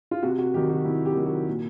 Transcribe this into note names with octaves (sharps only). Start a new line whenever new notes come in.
F4
C3 F#4
F#4
D#3 F#3 G4
F#4
C3 E4
G4
D#3 F#3
F#4
A#2